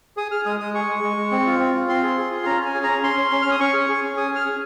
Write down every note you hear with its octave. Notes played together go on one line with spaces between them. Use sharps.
G#4 D#6
G#4 F6
G#3 D#6
G#3 D#6
G#4 C#6
G#3
G#3
G#3
C4
F4
C4
F4
C4 C6
G#4
G#4
F4
C6
C#4 A#5
C#4
G#5
G#4
C#4 A#5
C#4 C6
C#4
C#4
C#4 F6
D#6
C#4 C#6
G#4
G#4
C#4
G#4 D#6
G#4 F6
C#4